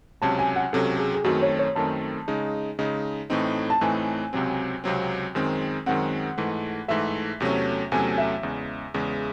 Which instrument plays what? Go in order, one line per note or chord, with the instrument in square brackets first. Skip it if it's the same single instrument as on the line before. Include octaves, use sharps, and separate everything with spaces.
[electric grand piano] C#2 C3 F#3 C#4 [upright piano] A5
[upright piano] G#5
F#5
[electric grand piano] C#2 C3 F#3 C#4 [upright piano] A4
[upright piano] G#4
G#4
[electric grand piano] F#2 D#3 A3 C4 [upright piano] F#4
[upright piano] C#5
C#5
[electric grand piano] F#2 D#3 A3 C4 [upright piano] A5
[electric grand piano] C#3 G#3 D#4
C#3 G#3 D#4
A2 E3 A3 C4 D#4
[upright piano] A5
[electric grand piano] A2 E3 A3 C4 D#4 [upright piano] G#5
[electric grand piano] C#2 C3 F#3 C4
C#2 C3 F#3 C4
F#2 D#3 G#3 C4
[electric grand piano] F#2 D#3 G#3 C4 [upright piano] F#5
[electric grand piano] G#2 E3 A3
[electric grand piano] G#2 E3 A3 [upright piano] E5
[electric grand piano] E2 C3 F#3 A3 C#4
[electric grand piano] E2 C3 F#3 A3 C#4 [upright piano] G#5
[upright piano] E5
[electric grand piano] E2 C#3 G#3
E2 C#3 G#3